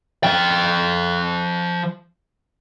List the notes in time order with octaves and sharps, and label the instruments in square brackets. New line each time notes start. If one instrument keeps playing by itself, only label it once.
[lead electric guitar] F3 G5